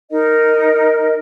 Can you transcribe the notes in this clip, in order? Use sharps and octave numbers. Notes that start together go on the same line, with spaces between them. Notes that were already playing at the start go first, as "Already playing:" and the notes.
D#4 A#4 D#5